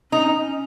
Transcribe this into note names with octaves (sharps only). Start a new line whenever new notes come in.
C#4 D#4